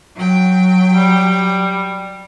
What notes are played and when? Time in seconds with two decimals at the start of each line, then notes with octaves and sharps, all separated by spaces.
0.16 F#3 G5
0.94 G3